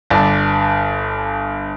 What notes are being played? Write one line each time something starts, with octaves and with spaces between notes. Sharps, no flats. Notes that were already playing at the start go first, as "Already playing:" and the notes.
G1 D5 A5